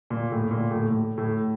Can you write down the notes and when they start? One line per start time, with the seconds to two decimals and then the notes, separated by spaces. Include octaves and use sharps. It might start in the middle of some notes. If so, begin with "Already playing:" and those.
0.10 A#2
0.32 A2
0.51 A#2
0.71 A2
0.91 A2
1.18 A2